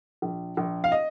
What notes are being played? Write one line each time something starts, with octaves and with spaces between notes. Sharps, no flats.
A#1
A#1
F5
D#5